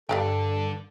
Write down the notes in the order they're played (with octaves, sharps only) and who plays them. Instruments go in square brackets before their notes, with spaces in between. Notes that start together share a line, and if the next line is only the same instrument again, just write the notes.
[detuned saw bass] G2 [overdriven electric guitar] D3 D5 [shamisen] G3 F5 G5 [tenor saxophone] A4